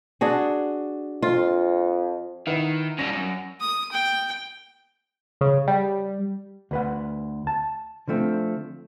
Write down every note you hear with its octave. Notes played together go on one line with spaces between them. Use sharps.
D4 F#4 G#4
F2 F4
D#3 E4 B4 F#5
C#3 G3 A#6
F#2
D#6
G5
C#3
G3
D2 B4 F#5
A5
D3 F3 A3 C4